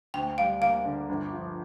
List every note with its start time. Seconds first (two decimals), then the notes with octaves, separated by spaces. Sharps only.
0.14 D2 G5
0.38 G3 F5
0.61 A#3 F5
0.85 D3
1.09 G1
1.33 F3